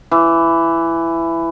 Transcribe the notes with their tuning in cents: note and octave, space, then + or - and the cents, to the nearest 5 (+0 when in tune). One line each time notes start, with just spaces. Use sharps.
E3 +15